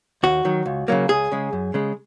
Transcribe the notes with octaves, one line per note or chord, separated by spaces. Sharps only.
D#2 F#4
D#3 F#3
C#2
C#3 F#3 A#3
C#2 G#4
C#3 G#3
F#2
C#3 G#3